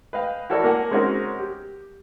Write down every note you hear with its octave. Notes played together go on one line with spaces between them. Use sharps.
B4 D#5 F5 G5
E4 F#4 A4 A#4 C#5 D5
A#3 A#4 F#5 G#5 A5
G#3 C4 C#4 D#4 F#4 A#4
G4